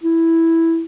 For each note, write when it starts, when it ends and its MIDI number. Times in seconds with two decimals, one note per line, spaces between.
0.03 0.84 64